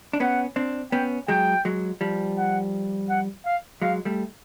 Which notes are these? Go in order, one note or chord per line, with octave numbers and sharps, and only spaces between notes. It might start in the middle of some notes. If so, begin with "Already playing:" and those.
D4
B3 C#4 F#5
C4 D4
B3 C#4 G5
F#3 G#3 G5
F#3 G#3
F3 G3
F#5
F#5
F5
F#3 G#3 F5
G3 A3